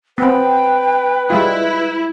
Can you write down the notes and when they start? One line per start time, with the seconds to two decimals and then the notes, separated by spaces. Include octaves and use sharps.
0.18 B3 C4 B4 G5
1.30 G3 G#3 E4 F4